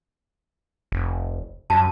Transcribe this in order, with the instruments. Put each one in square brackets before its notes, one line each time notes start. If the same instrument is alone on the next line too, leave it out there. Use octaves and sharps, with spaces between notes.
[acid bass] F1
[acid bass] F#2 [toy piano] F#4 A5